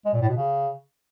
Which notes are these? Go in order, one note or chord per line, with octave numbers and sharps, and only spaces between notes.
G#3
A#2
A2
B2
C#3